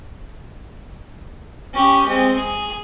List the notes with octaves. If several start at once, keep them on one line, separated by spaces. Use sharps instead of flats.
C#4 G4
G#3 C4
G#4